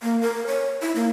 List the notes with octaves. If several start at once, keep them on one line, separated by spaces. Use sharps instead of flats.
A#3
A#4
C#5
E4
A#3